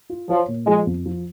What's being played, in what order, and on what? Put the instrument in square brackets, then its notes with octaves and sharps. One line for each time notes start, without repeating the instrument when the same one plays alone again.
[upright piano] F4
[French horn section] F3 [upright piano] C#5
[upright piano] A#2
[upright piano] F3 [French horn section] G#3
[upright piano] F2
F3